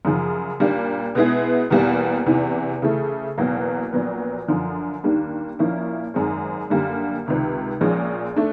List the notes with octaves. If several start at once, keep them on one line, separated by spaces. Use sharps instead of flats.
F#2 C#3 F3
A#2 G3 A#3 D4
B2 G#3 B3 E4 G#4
E2 B2 G3 A#3
E2 C3 E3
C#3 E3 A3
E2 B2 F#3 A#3
A#1 A#2 F#3 B3
F#2 D3 F3
D#2 D#3 G3 A#3 D4
A#2 F3 A#3 C#4 E4
G#1 F#2 D#3 G#3 C4
F#2 D3 G3 A#3
C#2 C3 D#3
A#1 A#2 F3 G#3 C#4
A3 D4